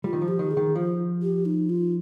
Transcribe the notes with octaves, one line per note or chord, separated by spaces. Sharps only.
G3 F4
D#3
F3
G4
D#3
G#4
D#3
F3 F4
G4
D#4
F4